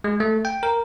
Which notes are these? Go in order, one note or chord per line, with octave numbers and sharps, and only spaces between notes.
G#3
A3
G5
A#4